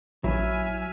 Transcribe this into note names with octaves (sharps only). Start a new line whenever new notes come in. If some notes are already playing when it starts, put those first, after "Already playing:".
A#1 F#3 E4 E5 G#5 F6